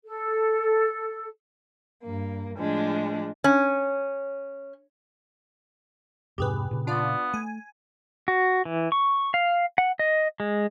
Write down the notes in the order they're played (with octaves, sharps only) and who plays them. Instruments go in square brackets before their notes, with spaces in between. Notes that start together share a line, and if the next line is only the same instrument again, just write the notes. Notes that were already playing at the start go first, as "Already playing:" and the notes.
[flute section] A4
[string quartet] G2 A#3
A2 F3 G#3 D4
[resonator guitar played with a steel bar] C#4
[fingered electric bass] F2 G#2 C3 [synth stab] G4 G#4 B4
[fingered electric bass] A#2 C#3
[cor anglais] B3 [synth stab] D4 F4 D5
[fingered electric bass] A3 [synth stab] G#5
[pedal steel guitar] F#4
E3
C#6
F5
F#5
D#5
G#3